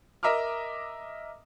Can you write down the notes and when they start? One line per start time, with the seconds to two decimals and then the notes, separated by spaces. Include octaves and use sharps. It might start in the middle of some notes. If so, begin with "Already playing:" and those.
0.23 A#4 D#5 E5 A#5 D6 F6